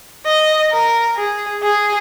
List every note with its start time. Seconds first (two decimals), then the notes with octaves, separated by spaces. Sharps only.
0.26 D#5
0.71 A#4
1.17 G#4
1.63 G#4